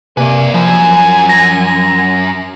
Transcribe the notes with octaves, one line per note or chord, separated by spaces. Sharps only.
C3 A#3 B4 D5 G#5
F#2 F3 G#5
A#6